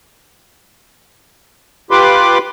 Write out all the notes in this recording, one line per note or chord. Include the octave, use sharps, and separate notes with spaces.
F4 G4 B4 B5 C6 D6